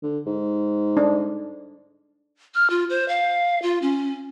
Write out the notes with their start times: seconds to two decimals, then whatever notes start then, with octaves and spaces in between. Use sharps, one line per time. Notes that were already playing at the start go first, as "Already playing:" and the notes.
0.03 D3
0.26 G#2
0.97 D4
2.55 F6
2.70 F4
2.90 C5
3.08 F5
3.62 F4
3.82 C#4